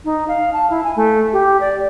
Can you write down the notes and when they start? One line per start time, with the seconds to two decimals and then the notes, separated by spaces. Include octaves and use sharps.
0.05 D#4
0.28 F5
0.53 A5
0.70 E4
0.84 G#5
0.96 A3
1.33 G4
1.61 D5